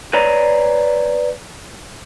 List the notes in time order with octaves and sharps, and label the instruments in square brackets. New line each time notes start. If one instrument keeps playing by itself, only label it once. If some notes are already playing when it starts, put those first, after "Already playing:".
[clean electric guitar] B4 C#5 D5 G#5 A#5